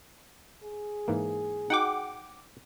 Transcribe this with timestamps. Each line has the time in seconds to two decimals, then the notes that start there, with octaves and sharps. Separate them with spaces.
0.63 G#4
1.08 G#2 E3 A#3
1.70 D#4 F#4 F#5 G5 D6